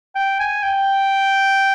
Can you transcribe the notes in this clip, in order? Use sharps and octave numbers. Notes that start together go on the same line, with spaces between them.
G5
G#5
G5